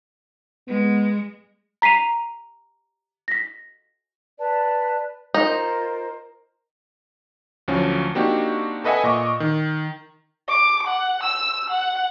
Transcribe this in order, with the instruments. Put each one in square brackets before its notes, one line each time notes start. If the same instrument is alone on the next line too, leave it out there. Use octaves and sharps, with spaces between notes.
[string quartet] G#3 [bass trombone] B3
[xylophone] A#5 B6 C7 D#7 F7
A#6 B6
[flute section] B4 D5 A5
[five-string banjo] D#4 [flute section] F4 A#4 C5
[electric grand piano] D2 F3 F#3 C#4
A#3 C4 D4 D#4 F#4 G4
A4 B4 D#5 E5 F#5 G#5
A#2 D#5 C#6 D6
D#3
[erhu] D6
F#5
E6
F#5